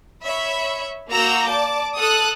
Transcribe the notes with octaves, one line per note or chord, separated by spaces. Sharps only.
C#5 E5 B5
A#3 F#4 A#5 E6 G6
D5 A5 D6
A4 D#6 F#6